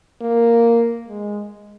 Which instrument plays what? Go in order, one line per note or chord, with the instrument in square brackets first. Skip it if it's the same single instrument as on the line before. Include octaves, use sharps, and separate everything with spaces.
[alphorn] A#3
G#3